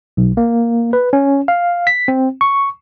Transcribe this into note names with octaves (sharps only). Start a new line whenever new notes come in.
B1
A#3
B4
C#4
F5
B6
C4
C#6